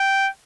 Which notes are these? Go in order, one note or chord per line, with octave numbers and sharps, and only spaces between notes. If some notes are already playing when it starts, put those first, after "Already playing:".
Already playing: G5